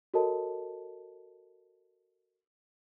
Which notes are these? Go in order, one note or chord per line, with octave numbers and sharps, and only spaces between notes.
F#4 A4 A#4 C#5 D#5 A5